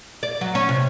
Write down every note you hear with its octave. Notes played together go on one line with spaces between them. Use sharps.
D5
F#3
C#4
C3